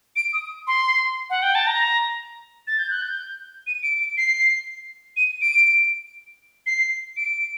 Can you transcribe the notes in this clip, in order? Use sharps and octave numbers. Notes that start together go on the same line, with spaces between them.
D7
D#6
C6
F#5
G5
A5
A#5
A6
G6
F#6
G6
D#7
D7
D7
C7
D#7
D7
C7
D7